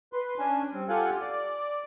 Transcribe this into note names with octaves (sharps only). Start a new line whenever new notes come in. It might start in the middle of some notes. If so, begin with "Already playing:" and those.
B4 C6
C#4 D4 G#5
G3 C4
F4 G4 A4 F5 F#5 G#5
D5